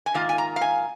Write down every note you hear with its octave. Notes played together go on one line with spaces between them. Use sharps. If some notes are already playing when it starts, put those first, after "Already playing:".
G#5
G#2 D#3 A#3 F4 F5
G#5
A#5
F5
G#5